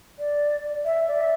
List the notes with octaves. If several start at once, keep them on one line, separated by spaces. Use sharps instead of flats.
D5
E5
D5
E5